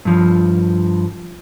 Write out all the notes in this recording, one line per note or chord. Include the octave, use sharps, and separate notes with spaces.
G2 F3